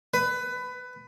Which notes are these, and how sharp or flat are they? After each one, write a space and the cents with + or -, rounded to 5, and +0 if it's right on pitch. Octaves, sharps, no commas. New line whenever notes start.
B4 +20